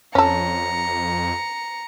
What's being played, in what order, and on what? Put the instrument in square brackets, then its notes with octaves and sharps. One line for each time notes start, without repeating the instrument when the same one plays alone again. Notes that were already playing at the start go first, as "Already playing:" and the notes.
[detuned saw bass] F2 [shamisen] C#4 A4 [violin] A#5 C#7